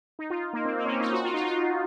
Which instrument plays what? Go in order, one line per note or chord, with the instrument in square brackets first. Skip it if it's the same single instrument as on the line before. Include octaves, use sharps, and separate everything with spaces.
[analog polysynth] D#4
F4
A#3
C4
A#3
C#4
C4
D#4
F#4
F4
D#4
F4